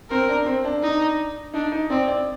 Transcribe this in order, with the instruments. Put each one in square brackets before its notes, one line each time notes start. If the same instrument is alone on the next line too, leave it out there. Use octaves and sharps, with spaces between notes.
[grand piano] C4 [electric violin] A#4
[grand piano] D4
C4
D4
[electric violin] D#4
[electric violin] D4 [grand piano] D#4
[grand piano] D#4
[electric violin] C4 [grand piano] D5
[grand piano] D5